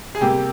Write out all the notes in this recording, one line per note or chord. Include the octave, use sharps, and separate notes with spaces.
G#4
C3 G3 A#3 G4